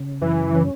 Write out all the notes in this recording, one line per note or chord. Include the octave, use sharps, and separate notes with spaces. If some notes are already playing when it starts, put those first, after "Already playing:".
Already playing: C#3
F#2 E3
C#4